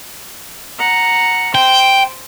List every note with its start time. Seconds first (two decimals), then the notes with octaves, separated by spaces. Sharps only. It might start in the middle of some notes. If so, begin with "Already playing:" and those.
0.79 F#5 A#5
1.55 C5 G5